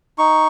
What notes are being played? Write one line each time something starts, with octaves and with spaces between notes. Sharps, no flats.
D#4 C#6